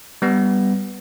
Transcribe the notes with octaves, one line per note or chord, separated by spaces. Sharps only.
G3 B3